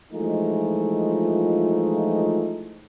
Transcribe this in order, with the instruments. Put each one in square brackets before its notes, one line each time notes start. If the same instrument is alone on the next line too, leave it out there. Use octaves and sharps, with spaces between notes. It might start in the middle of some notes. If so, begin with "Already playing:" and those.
[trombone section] E3 F3 G#3 A3 D#4 F4